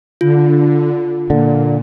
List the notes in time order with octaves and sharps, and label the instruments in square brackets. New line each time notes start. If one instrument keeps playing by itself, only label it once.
[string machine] D3 [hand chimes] F4
[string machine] A#2 [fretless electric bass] D3